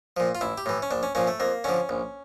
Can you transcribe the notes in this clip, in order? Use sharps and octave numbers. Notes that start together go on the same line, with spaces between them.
A#2 F3
F4
A1 E4
G4
A2 E3
C#4
A#1 D4
C#4
A#2 F3 C#4
A3
F2 A#3
D3 F3 C#4
A#1